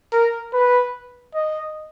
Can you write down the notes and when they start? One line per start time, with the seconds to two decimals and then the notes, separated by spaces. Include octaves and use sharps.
0.13 A#4
0.53 B4
1.35 D#5